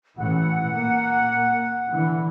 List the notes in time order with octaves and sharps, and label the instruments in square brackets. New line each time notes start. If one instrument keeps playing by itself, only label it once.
[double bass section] A1 A2 E3 [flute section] F#5
[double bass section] A#2 A#3
D3 E3